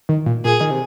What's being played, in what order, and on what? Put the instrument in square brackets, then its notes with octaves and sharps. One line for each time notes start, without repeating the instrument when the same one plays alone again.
[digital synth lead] D#3
A#2
[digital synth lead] A#2 [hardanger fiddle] G#4
[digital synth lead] D#3
C3